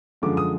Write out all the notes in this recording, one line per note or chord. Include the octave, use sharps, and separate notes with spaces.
F#2 D3 F3 G#3 D6
D#6